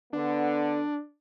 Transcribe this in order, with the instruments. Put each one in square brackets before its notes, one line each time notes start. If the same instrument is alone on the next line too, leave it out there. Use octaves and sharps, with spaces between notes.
[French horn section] D3 B3 [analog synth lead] D4